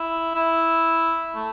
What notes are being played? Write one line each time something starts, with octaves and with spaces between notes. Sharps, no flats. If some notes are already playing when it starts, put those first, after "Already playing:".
Already playing: E4
E4
A3